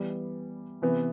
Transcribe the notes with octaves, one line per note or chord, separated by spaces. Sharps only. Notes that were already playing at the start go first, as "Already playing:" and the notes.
Already playing: E3 G3 B3
C3 E3 B3